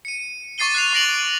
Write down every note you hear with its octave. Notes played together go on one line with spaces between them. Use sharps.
C#7 D#7
C#6 D6 A6 C7 D#7 G7
F#6 C7 F7
C#6 A#6 D7 F#7